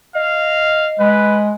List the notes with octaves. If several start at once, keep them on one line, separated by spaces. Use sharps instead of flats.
D#5 F5
G#3 B4